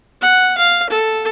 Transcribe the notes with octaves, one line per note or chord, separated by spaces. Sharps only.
F#5
F5
A4